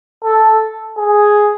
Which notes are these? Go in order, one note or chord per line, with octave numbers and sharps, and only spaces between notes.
A4
G#4